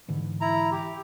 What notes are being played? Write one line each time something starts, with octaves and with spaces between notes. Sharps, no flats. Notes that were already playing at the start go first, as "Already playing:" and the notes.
G#2 D3 E3
E4 A#5
G4